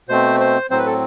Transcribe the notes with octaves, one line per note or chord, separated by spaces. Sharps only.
B2 A3 C4 C5
C5
A2 F#3 C4 C5
B4
A4